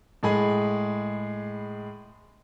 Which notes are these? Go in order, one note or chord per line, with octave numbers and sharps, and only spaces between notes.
A2 G#3 G#4 B5